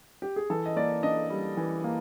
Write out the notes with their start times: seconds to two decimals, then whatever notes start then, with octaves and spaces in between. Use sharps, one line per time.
0.22 G4
0.36 G#4
0.50 E3 A4
0.66 D#5
0.76 A#3 D5
1.03 D4 D#5
1.30 G3
1.57 E3
1.84 A#3